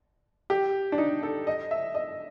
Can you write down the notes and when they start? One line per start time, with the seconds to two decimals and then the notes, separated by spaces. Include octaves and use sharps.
0.50 G4
0.92 D4
0.98 D#4
1.23 A4
1.47 D#5
1.71 E5
1.95 D#5